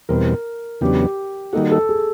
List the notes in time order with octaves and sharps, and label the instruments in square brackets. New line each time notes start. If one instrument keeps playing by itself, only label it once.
[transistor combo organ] E2 B2 G3 C4 [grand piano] A#4
[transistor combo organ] E2 C#3 F#3 B3 D4 [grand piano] G4
[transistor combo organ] D#3 G3 A#3 D#4 F#4 [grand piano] A4
[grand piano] A4
G#4